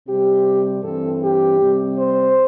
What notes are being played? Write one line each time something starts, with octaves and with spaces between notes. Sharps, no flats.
C3 G3 C4 G4
G2 E3 C4 A4
G4
C3 G3 C4
C5